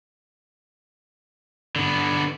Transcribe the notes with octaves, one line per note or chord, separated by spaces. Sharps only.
D3 B3